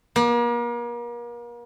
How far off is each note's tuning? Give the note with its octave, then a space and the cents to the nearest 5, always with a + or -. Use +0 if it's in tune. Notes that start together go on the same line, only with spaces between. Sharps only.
A#3 +40